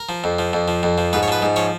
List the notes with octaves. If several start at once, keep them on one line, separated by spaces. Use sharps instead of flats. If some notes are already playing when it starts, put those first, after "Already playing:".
Already playing: A#4
F3
F2
F3
F2
F3
F2
F3
G#2 B4
C#5
F3 B4
G#2
F3 C#5